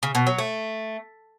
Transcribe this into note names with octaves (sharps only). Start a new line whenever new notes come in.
C#3
B2
F#3
A3